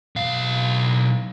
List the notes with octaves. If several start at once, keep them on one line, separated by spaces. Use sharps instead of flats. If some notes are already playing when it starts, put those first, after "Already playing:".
B1 F5